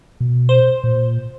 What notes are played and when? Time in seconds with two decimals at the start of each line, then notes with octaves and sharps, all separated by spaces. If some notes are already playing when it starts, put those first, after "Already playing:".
0.20 B2
0.49 C5
0.84 A#2